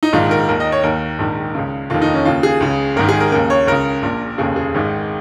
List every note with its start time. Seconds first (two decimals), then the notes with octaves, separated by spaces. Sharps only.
0.03 D#4
0.13 A#1 G#2 D#3 F4
0.31 A#4
0.49 D#2 D#3 A#4
0.60 D#5
0.72 C#5
0.83 D#2 D#3 A#4
1.19 A#1 G#2 D#3
1.55 C#2 C#3
1.90 F1 D#2 D#3 F4
2.02 D#4
2.14 C#4
2.25 D#2 C#3 F4
2.43 G#4
2.61 C#2 C#3
2.96 G#1 G#2 D#3 A#4
3.09 G#4
3.20 A#4
3.32 D#2 C#3 A#4
3.50 C#5
3.67 C#2 C#3 A#4
4.03 A#1 A#2
4.38 F1 D#2 C#3 G#4
4.56 G#4
4.74 G#1 G#2 D#3